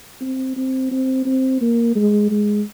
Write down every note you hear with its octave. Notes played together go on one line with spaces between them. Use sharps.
C4
C4
C4
C4
A#3
G#3
G#3